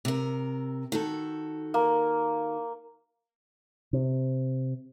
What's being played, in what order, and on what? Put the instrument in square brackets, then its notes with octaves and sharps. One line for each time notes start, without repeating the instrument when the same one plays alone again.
[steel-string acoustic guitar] C3 A#4
D#3 F#4 A4
[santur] A#3
[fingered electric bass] C3